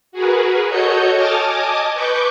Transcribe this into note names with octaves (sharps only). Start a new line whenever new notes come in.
F#4 G#4 A#4 B4
F#4 A4 C#5 D#5 G6 C#7
G#5 A5 D6 D#6 F6 A6
D#5 G#5 A5 D6 D#6
B4 C#6 D6 G6